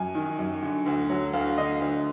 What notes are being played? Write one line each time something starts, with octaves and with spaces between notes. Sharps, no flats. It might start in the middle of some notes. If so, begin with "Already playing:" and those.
Already playing: F#2 G#5
D#3
F#2
D3
D2
F#3
D2 F5
D3 D#5
D2